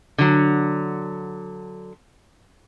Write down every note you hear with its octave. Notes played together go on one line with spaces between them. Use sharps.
D3 F#3